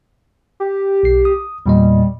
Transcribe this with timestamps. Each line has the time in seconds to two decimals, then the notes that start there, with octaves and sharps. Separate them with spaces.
0.60 G4
1.03 B1 C7
1.25 D#6
1.66 E2 A#2 G3 D#5